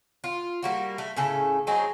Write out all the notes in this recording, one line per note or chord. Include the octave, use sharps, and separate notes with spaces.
F4
G3 A#3 F#4
A3
A2 C#3 A4
F#3 C4 D#4 G#4